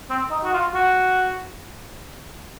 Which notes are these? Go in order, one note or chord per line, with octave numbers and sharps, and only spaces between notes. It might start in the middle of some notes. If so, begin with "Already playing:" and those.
C4
D#4
F#4
F4
F#4